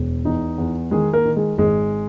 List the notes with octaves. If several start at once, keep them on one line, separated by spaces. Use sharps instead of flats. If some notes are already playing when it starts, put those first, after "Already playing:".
Already playing: E1
E2 D#4
E2
D#3 G#3 G#4
A#3 A#4
D#3
G#3 G#4
G#1 G#3 G#4